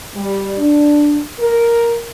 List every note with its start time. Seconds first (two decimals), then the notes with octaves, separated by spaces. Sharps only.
0.15 G3
0.57 D4
1.39 A#4